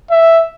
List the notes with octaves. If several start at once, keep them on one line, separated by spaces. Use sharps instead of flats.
E5